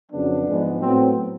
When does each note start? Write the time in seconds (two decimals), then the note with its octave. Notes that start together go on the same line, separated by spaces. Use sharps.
0.12 F2 C#3 F#3 B3 D4
0.47 G#2 F3 G#3 B3
0.81 A2 F#3 B3 C4